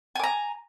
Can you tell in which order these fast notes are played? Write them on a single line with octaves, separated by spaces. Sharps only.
G#5 D6 A#5